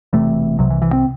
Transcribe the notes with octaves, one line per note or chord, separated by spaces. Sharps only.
E1 E2 C3 A3
C2 C3 F#3
E3
E3
C4